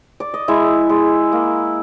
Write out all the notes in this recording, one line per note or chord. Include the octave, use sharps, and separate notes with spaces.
D5
D#5
G#3 E4 E5
G#3
A#3